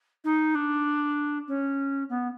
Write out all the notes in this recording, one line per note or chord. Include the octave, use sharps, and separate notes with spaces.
D#4
D4
C#4
B3